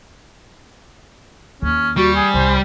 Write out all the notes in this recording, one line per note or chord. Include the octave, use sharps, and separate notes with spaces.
D#2 C#4
G3 F#4 C#6
G#4 G#5
C2 C5